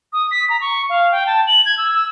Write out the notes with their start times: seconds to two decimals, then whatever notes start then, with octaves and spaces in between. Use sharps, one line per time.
0.13 D#6
0.31 B6
0.50 A#5
0.61 C#6
0.90 F5
1.12 G5
1.27 A5
1.47 F#7
1.66 G#6
1.78 E6
1.94 E6